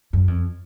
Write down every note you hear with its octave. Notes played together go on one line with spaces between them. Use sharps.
F#2
F2